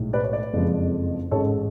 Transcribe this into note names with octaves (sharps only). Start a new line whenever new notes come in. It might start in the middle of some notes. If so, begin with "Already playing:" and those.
Already playing: B1 A2 G#3
B4 D5
C#5
B4 D5
F#1 F2 F3 G#3
A1 G#2 G#3 A4 C#5